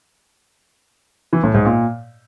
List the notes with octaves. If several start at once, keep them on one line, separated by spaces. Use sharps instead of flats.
E3
A2
G#2
A#2